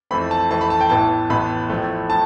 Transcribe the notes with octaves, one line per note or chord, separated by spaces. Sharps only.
F2 E3 A3 C4 B5
A5
F2 E3 A3 C4 A5
B5
A5
G5
A1 A2 E3 B3 A5
A1 A2 E3 B3 B5
A1 A2 F3 A3
A2 A5